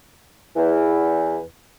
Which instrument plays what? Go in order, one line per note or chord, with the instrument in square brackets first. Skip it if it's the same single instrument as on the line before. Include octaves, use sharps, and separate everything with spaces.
[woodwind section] E2 E3